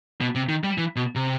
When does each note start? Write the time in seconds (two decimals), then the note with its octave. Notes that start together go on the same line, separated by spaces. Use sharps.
0.21 B2
0.35 C3
0.49 D#3
0.64 G3
0.78 E3
0.96 B2
1.15 C3